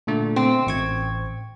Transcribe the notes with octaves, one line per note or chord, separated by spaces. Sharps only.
A#2 D3 A3
C4
A1 C#6 G#6